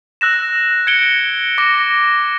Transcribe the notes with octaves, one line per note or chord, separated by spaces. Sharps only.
E6 F#6 A#6 E7
G#6 C#7 D7 G7
D6 A#6